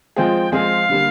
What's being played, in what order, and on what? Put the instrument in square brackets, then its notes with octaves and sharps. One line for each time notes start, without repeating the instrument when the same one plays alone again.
[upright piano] F3 G#3 C4 F4 G#4 [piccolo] G5
[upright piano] F3 G#3 C4 F4 G#4 [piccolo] F5
[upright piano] D3 G3 A#3